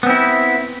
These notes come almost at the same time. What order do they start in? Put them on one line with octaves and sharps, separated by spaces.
B3 C4 E4